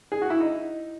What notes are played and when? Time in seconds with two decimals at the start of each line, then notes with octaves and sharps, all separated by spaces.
0.12 G#4
0.22 F#4
0.30 E4
0.40 D#4